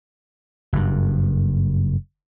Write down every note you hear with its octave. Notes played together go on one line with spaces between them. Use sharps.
F#1 G2